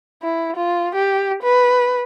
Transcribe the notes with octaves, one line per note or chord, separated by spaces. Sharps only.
E4
F4
G4
B4